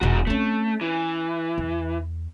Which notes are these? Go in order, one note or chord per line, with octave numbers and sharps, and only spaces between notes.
E1 G#2 B2 F#4
A3 C4 C#4
E3
E2